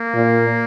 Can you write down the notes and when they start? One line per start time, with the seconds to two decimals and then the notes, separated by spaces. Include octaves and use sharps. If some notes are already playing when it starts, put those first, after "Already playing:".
Already playing: A#3
0.14 A#2